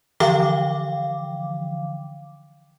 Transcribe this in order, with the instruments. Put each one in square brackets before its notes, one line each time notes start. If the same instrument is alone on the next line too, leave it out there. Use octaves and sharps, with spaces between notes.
[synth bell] D3 E3 F3 F5 G5 D6